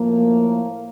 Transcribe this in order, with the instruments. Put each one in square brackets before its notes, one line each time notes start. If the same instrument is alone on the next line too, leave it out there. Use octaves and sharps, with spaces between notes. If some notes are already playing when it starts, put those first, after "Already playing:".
Already playing: [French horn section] A2 F3 A#3